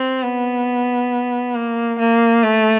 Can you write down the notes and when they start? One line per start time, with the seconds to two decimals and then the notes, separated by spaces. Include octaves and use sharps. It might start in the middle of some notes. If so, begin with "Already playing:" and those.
Already playing: C4
0.22 B3
1.55 A#3
1.99 A#3
2.43 A3